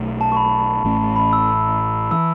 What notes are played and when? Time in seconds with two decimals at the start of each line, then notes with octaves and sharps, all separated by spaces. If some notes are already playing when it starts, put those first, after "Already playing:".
Already playing: B1 B2 A3
0.21 A5
0.32 C#6
0.37 B5
0.84 A1 A2 A3 C#4
1.16 B5
1.33 E6
2.11 E3 E6